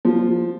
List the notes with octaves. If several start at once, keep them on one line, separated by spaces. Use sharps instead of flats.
F3